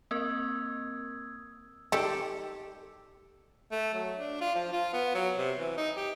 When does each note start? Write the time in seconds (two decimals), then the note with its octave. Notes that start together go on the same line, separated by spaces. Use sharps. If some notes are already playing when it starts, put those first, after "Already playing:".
0.11 A#3 C4 A#4 D#6 E6 G#6
1.92 D#3 G3 G4 A4
3.71 A3
3.94 F#3
4.17 D4
4.41 F4
4.55 F3
4.72 F4
4.93 B3
5.15 F#3
5.36 C3
5.59 E3
5.77 D#4
5.97 G4